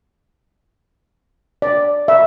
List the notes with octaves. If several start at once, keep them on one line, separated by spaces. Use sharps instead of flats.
D5
E5